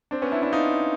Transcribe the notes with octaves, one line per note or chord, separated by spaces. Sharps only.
C4 D4
B3 C#4
D4 E4
D4 E4
D#4 F4